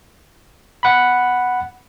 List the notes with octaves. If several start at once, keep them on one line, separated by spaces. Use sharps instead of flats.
F#5 B5